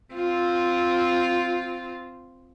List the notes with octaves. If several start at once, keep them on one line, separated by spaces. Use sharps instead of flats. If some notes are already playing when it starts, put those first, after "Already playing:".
C4 F4